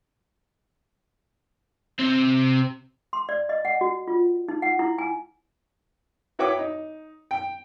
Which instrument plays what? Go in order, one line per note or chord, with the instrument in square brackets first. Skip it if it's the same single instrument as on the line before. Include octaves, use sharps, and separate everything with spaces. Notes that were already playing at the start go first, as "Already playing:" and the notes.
[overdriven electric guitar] C3 C4
[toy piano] C6
D5
D#5
F#5
F#4
F4
D#4
F#5
E4
G#5
[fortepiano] E4 F#4 B4 C#5 G5 D6
D#4
G5